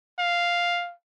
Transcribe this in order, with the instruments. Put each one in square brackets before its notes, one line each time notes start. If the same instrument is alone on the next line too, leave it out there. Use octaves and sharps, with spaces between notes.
[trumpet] F5